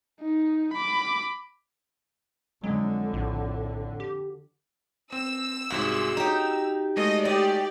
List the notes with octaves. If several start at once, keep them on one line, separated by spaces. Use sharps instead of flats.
D#4
B5 D6
F2 D3 F#3 G#3
A#1 A2
G4
C4 E6
C2 G#2 F#4 G#4
D#4 G4 A#5
G#3 A3 D#5
G4 D5 D#5